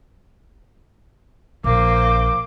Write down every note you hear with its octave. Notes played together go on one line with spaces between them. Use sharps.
A#1 A#3 C5 D6